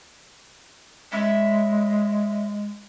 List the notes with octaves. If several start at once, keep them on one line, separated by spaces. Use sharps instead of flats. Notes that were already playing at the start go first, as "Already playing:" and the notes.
G#3 C#4 E4 E5